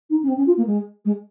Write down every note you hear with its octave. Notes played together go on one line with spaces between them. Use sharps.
D#4
C#4
C4
C#4
F4
A#3
G#3
G#3